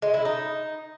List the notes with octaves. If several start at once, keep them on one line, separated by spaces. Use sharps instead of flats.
G#3
E4
D#4